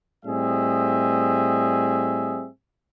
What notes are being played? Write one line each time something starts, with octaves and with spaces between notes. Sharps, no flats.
A2 G3 C4 G#4 D#5 E5